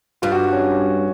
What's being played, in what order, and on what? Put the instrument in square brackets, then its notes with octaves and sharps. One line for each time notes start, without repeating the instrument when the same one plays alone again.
[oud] G2 [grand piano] F4
[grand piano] F#4
C#4